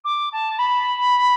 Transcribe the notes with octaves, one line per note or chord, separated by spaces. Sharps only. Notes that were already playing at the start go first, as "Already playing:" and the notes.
D6
A5
B5